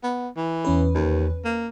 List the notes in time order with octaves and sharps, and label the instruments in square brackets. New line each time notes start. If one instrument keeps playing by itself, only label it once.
[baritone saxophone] B3
E3
[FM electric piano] E2 C#4 B4
[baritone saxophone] D#2
A#3